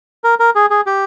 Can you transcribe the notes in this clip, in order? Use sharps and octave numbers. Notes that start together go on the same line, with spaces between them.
A#4
A#4
G#4
G#4
G4